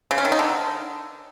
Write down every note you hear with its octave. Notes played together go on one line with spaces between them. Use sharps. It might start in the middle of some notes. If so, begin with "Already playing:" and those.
C#3
C#4
D#3
D#4
D3